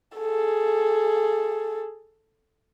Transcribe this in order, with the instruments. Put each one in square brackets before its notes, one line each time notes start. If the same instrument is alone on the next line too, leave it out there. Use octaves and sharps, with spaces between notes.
[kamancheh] G#4 A4